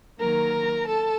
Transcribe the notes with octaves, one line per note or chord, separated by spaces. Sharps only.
D#3 F#3 A#3 A#4 A#5
A4 A5